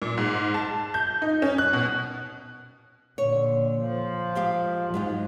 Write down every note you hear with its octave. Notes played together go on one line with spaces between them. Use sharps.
A#2
G#2
A5
G6
D#4
C#4
F#6
B2
A#2 D3 C#5
F3
G#3 G4 F5
G#2 F#3 G#3 F4